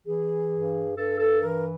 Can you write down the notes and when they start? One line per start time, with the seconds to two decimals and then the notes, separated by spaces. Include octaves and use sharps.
0.07 E3 G#4
0.52 G2
0.97 G2 A4
1.19 A4
1.41 E3 A#4